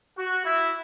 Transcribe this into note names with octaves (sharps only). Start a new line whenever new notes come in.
F#4
E4